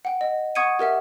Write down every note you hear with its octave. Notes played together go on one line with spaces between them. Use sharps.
F#5 G5
D#5
F#5 C#6 D#6 G#6 C#7 D#7
G4 A#4 E5 F#5